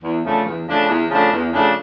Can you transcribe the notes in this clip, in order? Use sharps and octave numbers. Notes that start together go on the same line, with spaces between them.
E2
C#3 F3 A3 D4
E2
C#3 F3 A3 D4
E2
C#3 F3 A3 D4
E2
C#3 F3 A3 D4